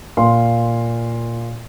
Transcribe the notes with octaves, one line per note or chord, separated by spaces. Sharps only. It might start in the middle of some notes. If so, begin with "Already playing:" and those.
A#2 F5 C6